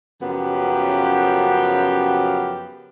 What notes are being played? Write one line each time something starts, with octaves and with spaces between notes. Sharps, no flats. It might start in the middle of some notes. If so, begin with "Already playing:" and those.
F#2 C#3 F3 B3 G4